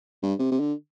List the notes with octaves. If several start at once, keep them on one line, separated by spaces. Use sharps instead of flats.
G2
C3
C3
D3